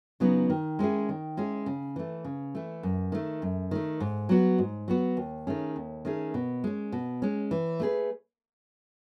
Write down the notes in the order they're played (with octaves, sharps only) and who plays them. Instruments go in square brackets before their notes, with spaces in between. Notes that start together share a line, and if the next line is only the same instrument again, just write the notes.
[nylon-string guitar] C#3 F#3 B3 D#4
D#3
G#3 C#4 E4 G#4
D#3
G#3 C#4 E4 G#4
C#3
E3 A3
C#3
E3 A3
F#2
D#3 A3
F#2
D#3 A3
G#2
F#3 B3 F#4
G#2
F#3 B3 F#4
D#2
D#3 A3 C#4 G#4
D#2
D#3 A3 C#4 G#4
B2
G#3 C#4
B2
G#3 C#4
E3
A3 D#4 G#4 B4